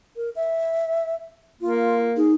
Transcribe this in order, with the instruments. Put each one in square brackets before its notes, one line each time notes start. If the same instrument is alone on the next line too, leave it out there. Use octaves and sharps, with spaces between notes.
[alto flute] A#4
E5
[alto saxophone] A#3 [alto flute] F4
[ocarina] D#4 [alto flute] G#4